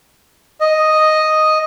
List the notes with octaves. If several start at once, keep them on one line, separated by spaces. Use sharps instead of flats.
D#5